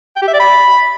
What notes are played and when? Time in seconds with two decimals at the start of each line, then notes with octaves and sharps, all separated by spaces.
0.16 G5
0.22 G4
0.28 E5
0.34 D5
0.40 B5